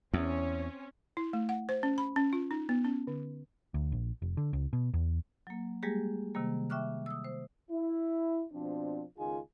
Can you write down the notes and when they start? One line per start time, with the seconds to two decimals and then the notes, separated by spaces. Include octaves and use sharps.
0.14 E2 C4 C#4
1.17 E4
1.33 A3
1.49 F#5
1.69 C5
1.83 C#4
1.98 B5
2.16 C#4
2.33 F4
2.51 D#4
2.69 B3
2.85 C#4
3.07 D3
3.74 D2
3.92 A#1
4.22 F1
4.37 D3
4.53 C#2
4.73 B2
4.94 E2
5.47 F#3 A#3
5.83 G3 G#3 A#3 G4 G#4
6.35 C3 D#3 G3 A#3
6.70 E5 G5 C#6 D6 F6 F#6
7.06 D#6 E6
7.24 C5
7.71 E4
8.52 B2 F3 C4 D4
9.18 C#2 D#3 D#4 F4 G#4 G#5